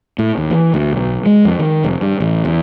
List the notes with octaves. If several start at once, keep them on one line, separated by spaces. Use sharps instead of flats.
A2
D#2
E3
D2
B1
G#3
F2
D#3
F1
G2
A1
E2